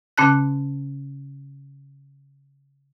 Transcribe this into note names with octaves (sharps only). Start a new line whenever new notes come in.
C#3 C#4 A5 F#6